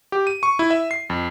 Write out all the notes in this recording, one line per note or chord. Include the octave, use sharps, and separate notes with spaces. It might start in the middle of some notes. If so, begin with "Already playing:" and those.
G4
D#7
C#6
E4
E5
C7
F2